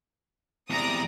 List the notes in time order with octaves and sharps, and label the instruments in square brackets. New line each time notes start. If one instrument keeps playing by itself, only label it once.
[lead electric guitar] E2 C3 [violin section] D5 A#5 D#6